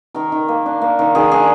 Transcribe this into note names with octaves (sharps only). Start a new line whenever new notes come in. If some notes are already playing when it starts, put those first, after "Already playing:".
D#3 A#4
D#3
A#3
D4
A#3
D#3
D#3 G#4
D4 G#4